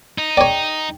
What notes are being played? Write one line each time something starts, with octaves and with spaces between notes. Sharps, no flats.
D#4
G#4 C#5 D5 G5